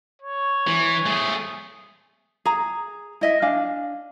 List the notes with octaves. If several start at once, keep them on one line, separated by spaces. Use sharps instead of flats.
C#5
E3
A3 G#4
G#4 A#5
E4 D#5 E5
D4 F5 G#5